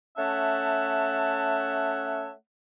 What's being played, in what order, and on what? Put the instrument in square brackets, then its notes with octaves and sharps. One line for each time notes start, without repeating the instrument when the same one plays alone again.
[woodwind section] A3 C#4 C#5 E5 F#5 A5